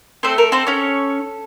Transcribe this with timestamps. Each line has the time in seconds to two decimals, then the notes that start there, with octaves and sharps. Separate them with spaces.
0.23 A3 C4 A4 C5
0.38 A#4
0.52 C4 C5
0.67 C#4 C#5